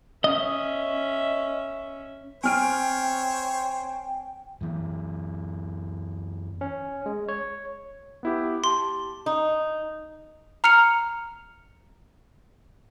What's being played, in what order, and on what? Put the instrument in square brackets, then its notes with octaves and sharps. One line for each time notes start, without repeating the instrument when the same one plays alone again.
[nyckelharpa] C#4 E5 [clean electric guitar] D#5
[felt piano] C4 F6 D7 [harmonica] C5 C#5 [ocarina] G5 [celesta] G#5
[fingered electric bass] F#2 E3
[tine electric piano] C#4
G#3
C#5
[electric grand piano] B3 E4 G4
[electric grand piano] G4 A5 [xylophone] C6
[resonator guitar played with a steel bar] D#4
[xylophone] A#5 F6 C#7 F7